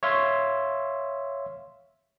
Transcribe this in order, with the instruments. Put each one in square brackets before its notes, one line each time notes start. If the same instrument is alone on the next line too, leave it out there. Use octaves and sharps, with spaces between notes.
[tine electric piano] C#5 E5 F5 C6